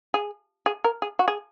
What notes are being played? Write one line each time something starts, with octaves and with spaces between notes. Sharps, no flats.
G#4
G#4
A#4
G#4
F#4
G#4